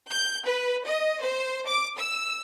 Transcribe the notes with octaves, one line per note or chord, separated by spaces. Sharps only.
G6
B4
D#5
C5
D6
E6